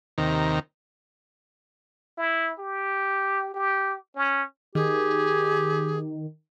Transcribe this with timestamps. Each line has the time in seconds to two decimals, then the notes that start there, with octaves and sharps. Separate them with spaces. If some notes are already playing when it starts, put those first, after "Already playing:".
0.18 D#2 C3 D#3 A#5
2.18 E4
2.59 G4
3.54 G4
4.16 C#4
4.75 D#3 G4 G#4